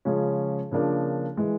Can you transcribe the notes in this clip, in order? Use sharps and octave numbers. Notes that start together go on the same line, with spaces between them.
C#3 F3 G#3 C#4
C#3 F3 A#3 D4
E3 G#3